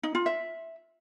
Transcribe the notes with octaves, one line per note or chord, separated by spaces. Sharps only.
D#4
F4
E5